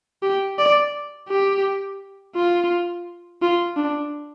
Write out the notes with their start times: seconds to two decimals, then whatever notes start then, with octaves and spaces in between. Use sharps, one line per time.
0.23 G4
0.59 D5
1.29 G4
2.36 F4
3.42 F4
3.77 D4